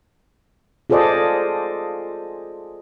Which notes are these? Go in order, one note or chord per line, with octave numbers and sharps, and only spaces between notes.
F4 G#4 A4 C5 D5 D#5